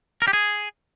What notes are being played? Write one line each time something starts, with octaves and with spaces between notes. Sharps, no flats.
A#4
G4
G#4